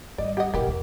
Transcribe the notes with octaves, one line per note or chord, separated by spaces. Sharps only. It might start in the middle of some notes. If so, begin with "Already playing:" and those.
G#1 G3 D5 D#5
G4 D#5 F#5
G#2 B2 E3 G4 A#4
A1 E2